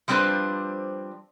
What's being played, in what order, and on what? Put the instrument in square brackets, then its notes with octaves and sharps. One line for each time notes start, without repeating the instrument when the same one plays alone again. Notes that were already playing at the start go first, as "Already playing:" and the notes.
[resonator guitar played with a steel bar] F3 G3 C4 D4 B4 C5